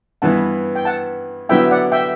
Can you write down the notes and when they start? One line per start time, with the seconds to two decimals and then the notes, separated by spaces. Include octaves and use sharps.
0.22 G2 E3 B3 F#5 A5
0.76 G5
0.85 F#5 A5
1.49 D3 F#3 B3 E4 E5 G5
1.71 D5 F#5
1.92 E5 G5